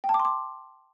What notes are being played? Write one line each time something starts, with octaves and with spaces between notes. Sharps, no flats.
G5
A5
D6
C6
D6